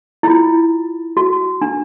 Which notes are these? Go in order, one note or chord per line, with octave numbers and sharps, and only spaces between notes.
E4
F4
F#4
D4